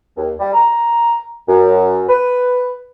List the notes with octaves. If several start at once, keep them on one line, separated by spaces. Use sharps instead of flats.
D#2
G3
A#5
F#2
B4